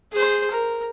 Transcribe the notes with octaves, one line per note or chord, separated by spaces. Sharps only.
G#4 C5
A#4